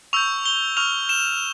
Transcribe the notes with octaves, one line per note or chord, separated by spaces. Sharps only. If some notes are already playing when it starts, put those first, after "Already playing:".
C#6 E6 G6 F7
G7
C#6 F6 F7
E7